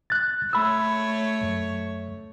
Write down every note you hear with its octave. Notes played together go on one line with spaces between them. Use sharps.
F#6 A6
A3 C#5 B5 E6
F#2